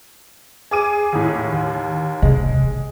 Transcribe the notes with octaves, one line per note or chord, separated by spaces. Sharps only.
G#4 D6 D#7
D#2 A2
D#2
C3 G#3